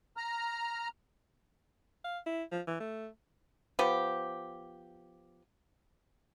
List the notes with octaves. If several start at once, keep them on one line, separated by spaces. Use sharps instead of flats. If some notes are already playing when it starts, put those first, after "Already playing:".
A#5 F6
F5
E4
F3
E3
A3
F3 B3 G4